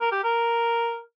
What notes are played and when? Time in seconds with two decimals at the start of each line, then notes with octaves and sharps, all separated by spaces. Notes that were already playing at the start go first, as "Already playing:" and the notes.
0.01 A#4
0.12 G4
0.24 A#4